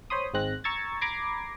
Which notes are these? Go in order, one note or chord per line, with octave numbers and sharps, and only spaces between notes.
C5 C#5 B5 C6 D#6
G#1 G#2 G#3 C4 F#6 A#6
A#5 C#6 E6 G#6 A6
A#5 B5 D6 G#6 A#6 C7